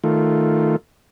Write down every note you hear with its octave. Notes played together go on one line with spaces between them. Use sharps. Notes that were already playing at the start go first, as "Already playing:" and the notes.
D#3 A3 F4